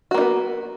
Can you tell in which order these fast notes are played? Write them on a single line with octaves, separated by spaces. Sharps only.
F#4 A#3 D#4 B3